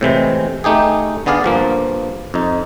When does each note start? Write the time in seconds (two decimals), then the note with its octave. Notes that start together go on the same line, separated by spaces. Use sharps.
0.01 A2 C3 E3 G#3
0.64 A3 D#4 G4 G#4
1.26 D3 B3 G#4 D5 F5
1.44 G2 F3 A#3
2.34 F2 D#4